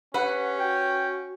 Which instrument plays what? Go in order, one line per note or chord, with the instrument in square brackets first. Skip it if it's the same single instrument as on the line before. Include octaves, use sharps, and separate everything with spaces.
[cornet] C#4 [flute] G4 [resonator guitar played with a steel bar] B4 F#5
[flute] F#4 [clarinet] G5